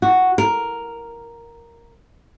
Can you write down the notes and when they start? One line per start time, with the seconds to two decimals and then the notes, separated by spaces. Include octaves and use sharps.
0.02 F#4
0.38 A#4